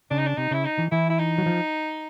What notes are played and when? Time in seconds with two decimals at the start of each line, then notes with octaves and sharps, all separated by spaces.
0.11 C#3 D4
0.19 D#4
0.27 D4
0.37 C3 D#4
0.51 C#3 E4
0.65 D#4
0.78 E3
0.92 E3 E4
1.10 E4
1.19 D#4
1.38 F#3
1.46 F3